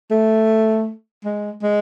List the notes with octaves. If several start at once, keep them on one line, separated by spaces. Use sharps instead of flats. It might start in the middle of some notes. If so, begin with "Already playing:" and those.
A3
G#3
G#3